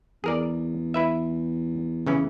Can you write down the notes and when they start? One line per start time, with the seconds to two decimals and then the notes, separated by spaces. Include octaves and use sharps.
0.24 E2 G#4 A#4 D5
0.94 E4 B4 E5
2.07 C#3 E3 C#4